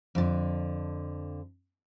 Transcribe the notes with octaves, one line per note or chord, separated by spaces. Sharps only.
F2 D3